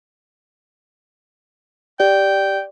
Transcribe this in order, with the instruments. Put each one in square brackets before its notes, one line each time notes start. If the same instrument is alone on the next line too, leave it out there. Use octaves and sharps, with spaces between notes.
[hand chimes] G4 D5 [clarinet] G5